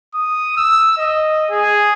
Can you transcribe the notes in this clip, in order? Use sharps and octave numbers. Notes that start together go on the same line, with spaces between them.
D#6
E6
D#5
G#4